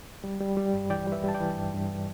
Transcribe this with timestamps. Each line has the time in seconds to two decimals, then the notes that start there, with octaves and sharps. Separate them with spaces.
0.24 G3
0.40 G3
0.57 G3
0.73 G2
0.90 E3 D5 G5
1.07 G3
1.12 B4 E5
1.24 G3 A5
1.35 D5 G5
1.40 E3
1.57 G2
1.74 G2